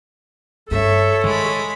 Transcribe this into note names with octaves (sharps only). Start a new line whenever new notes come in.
G2 C#4 A4 C#5 E5
D#3 G#3 B5